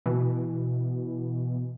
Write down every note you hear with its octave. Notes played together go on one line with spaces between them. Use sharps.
B2 E3